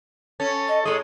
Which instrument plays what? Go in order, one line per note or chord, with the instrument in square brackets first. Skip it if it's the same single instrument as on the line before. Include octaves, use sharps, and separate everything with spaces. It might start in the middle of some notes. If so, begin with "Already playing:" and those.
[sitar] C#4 [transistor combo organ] A4
[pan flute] D#5
[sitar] A2 G#3 [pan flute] A4 [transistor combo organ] D#5